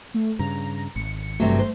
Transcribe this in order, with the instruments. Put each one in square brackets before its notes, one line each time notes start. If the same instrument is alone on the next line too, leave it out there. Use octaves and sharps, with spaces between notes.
[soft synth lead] A3
[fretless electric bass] G2 C#3 [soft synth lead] A#5
[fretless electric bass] G#1 [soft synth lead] C#7
[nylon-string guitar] G2 C3 F#3 [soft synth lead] A3
[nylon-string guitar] C5